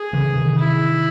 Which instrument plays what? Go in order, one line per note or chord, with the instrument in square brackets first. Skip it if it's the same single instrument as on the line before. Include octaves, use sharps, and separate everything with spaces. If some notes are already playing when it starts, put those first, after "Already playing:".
Already playing: [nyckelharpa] G#4
[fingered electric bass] C#3 E3
C3 D#3
[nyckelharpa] E4